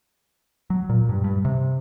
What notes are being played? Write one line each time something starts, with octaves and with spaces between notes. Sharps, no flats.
F#3
A#2
G2
G2
C3